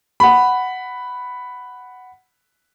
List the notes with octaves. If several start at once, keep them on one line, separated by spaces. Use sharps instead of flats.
F#5 B5